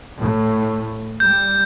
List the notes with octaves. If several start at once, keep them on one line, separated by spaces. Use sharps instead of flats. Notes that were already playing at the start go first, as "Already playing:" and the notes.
A2
G3 G6